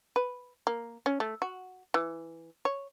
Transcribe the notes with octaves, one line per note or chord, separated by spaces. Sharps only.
B4
A#3
C#4
A3
F#4
E3
C#5